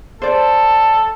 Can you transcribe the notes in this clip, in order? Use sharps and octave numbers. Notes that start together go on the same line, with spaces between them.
A4 C5 D5